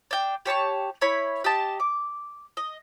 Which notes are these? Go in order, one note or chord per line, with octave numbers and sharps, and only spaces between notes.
D4 G5
G4 C#5 A5 C#6
E4 C#5 B5
G4 D#5 A5
D6
D#5